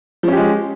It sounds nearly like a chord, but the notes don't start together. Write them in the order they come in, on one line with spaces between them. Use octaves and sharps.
F3 C#4 G4 G#3